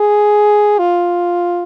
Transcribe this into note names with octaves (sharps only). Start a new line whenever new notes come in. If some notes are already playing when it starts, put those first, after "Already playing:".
Already playing: G#4
F4